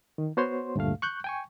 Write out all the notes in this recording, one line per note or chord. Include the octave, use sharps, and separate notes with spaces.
D#3
B3 F#4 C5 C#5 C6
D2 G2 A#2 A3 F5
C#6 F#6 G6
G5 G#5 C#6